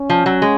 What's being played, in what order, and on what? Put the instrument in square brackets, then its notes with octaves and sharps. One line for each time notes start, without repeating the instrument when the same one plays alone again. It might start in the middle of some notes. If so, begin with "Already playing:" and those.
Already playing: [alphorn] C#4
[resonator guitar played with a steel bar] F3
F#3
G#3